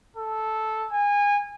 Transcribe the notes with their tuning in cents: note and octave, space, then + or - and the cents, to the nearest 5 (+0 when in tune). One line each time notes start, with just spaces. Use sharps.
A4 -10
G#5 -25